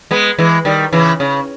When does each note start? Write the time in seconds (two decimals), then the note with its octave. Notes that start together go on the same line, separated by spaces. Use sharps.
0.11 G#3 B3
0.39 E3 G#3
0.65 D#3 G3
0.93 C#3 E3
1.20 C#3